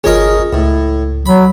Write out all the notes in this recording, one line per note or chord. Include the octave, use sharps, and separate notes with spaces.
G1 C#4 F4 G#4 A#4 D#5
C#2 A2
F#3 B5